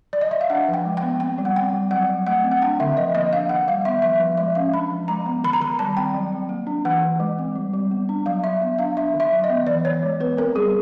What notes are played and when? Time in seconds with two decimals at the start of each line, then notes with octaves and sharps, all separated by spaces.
0.13 D5
0.21 D#5
0.31 E5
0.41 F5
0.50 D4 F#5
0.68 F3
0.74 G5
0.85 G#3
0.97 G5
1.02 B3
1.20 C4 G5
1.38 G3
1.45 F#5
1.56 C4 G5
1.73 G3
1.91 F#3 F#5
2.09 F#3
2.27 A3 F#5
2.44 C4
2.51 F#5
2.62 D4 G5
2.80 D3 E5
2.97 F3 D#5
3.15 A#3 D#5
3.32 D4 F5
3.49 D#3 F#5
3.68 G3 F5
3.85 B3 E5
4.02 F3 E5
4.20 F3
4.38 G#3 E5
4.55 C#4 F5
4.73 D4 B5
4.91 F3
5.08 G#3 A#5
5.26 B3
5.44 D#3 B5
5.53 A#5
5.61 D#3 B5
5.79 G3 A5
5.97 C4 G5
6.14 F#3
6.32 F#3
6.49 A#3
6.67 D4
6.85 E3 F#5
7.03 E3
7.20 G#3
7.39 C4
7.55 G3
7.74 G3
7.91 B3
8.09 D4
8.26 F#3 F5
8.43 F#3 E5
8.62 B3
8.79 D4 F5
8.97 D4 E5
9.14 D#3
9.20 E5
9.31 F#3
9.44 D#5
9.49 B3
9.67 E3 D5
9.85 E3 C#5
10.03 G#3
10.20 B3 B4
10.37 C4 A#4
10.55 G3 G#4